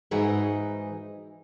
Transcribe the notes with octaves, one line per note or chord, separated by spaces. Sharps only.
G#2 E3 D#4 F#4 G#4 E5